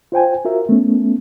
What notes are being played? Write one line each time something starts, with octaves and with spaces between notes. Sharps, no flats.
F4 C5 G5 G#5
F4 F#4 A#4 E5
A3 B3 C#4